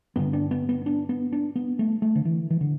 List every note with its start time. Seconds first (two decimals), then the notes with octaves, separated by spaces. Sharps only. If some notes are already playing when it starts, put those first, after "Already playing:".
0.16 G2 D3 B3
0.33 D4
0.51 B3
0.69 B3
0.86 D4
1.09 B3
1.32 D4
1.56 B3
1.79 A3
2.02 A3
2.15 D3
2.25 E3
2.50 E3
2.61 D3